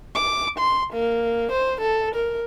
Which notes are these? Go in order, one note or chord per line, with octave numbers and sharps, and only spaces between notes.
D6
C6
A#3
C5
A4
A#4